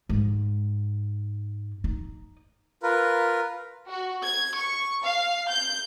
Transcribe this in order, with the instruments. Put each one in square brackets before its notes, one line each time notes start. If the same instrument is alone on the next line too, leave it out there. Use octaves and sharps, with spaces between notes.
[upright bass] G#2
D#4
[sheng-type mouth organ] F4 A#4 B4
[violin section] F#4
G#6
C#6
F5
G6